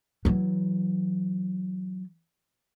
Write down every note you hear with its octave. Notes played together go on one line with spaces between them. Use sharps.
E3 F#3